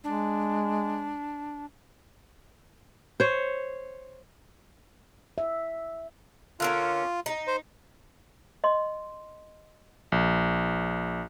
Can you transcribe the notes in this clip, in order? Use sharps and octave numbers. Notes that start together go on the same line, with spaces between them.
G#3 D4
C5 C#5
E5
D3 A#3 C#4 F4
D#4
C5
D#5 C6
A#1